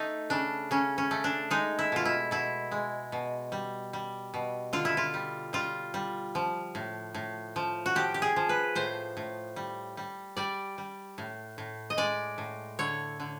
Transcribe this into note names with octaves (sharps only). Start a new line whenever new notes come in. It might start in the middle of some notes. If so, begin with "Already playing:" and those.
Already playing: A3 D#4
C#3 D4
C#3 C#4
C#4
A3
D4
G#3 D#4
E4
B2 F4
E4
B2 E4
G#3
B2
G3
G3
B2
D3 F4
E4
F4
G3
G3 F4
G3
F3
A2
A2
F3
F#4
F3 G4
G4
G#4
F3
B4
A2 C5
A2
G3
G3
G3 D5
G3
A2
A2
D#5
G#3 D5
A2
D3 C#5
D3